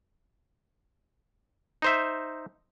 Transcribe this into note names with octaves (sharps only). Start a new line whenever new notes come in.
D#4 C5 E5